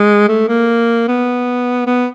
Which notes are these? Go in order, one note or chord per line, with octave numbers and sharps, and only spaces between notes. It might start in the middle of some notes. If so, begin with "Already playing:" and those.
Already playing: G#3
A3
A#3
B3
B3